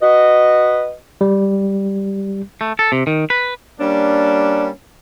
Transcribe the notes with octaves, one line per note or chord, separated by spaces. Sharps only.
F#4 B4 D#5
G3
A3
A4
C3
D#3
B4
G3 A#3 C#4 D4